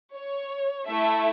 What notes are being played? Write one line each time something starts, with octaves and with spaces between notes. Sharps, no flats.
C#5
A3 E4 A4 E5